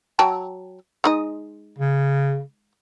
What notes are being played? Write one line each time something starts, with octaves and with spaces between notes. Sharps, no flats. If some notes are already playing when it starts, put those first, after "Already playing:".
F#3 G5 A5
G#3 D#4 D#5
C#3